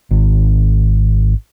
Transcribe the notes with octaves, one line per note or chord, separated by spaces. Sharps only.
G#1